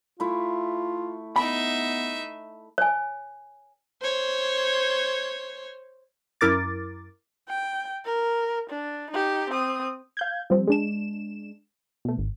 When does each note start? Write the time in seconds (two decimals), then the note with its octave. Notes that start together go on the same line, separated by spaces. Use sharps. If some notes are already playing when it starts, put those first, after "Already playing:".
0.20 A3 E4 F4
1.36 B3 D#4 E5 B5
2.78 C#5 G#5
4.02 C5 C#5
6.41 F#2 E4 A#4 D6 A6
7.49 G5
8.06 A#4
8.70 D4
9.11 D#4 G4
9.50 C4 D#6
10.17 F5 G6 G#6
10.50 F3 G3 C4
10.67 G#3 D4 E7
12.05 B2 A3
12.18 G#1